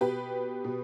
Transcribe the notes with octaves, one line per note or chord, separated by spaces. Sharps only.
B2 G4 B4
B2